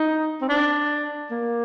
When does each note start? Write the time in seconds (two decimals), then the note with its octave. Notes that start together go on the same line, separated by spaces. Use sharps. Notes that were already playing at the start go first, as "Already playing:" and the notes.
Already playing: D#4
0.42 C4
0.49 D4
1.31 A#3